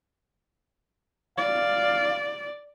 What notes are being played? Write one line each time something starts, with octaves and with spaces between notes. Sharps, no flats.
D5 F5